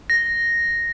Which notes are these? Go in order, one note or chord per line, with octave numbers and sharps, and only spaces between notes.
A#6